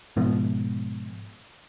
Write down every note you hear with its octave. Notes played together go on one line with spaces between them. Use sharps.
G#2 B2 F3